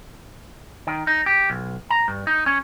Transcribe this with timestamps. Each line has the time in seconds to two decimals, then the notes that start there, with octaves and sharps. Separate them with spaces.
0.87 D#3
1.07 D#4
1.26 G4
1.50 B1
1.90 A#5
2.08 G2
2.27 D#4
2.46 C#4